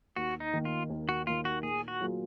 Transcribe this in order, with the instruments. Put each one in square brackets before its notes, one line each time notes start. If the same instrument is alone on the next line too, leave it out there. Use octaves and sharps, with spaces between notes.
[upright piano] D#2 [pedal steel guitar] F#4
[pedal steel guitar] D#4
[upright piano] D#3 A#3
[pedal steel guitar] F4
[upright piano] D#2
[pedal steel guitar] F#4
[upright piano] D#3 A#3 [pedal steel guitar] F4
[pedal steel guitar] F#4
[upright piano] A#2 [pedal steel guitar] G#4
[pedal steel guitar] F#4
[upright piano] F#3 A#3 F4 G#4